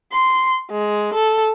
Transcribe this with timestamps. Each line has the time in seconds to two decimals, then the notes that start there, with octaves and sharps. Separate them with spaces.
0.12 C6
0.71 G#3
1.14 A4